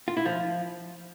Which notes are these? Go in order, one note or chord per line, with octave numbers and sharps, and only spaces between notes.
F4
E4
F3